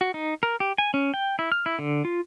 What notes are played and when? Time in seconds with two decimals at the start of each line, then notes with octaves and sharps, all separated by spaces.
0.01 F#4
0.14 D#4
0.43 A#4
0.60 G4
0.78 G#5
0.94 C#4
1.14 G5
1.39 E4
1.52 F6
1.66 E4
1.79 D3
2.05 F4